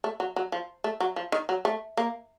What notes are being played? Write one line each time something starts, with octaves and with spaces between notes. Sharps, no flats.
A3
F#3
F#3
F3
A3
F#3
F3
D#3
F#3
A3
A#3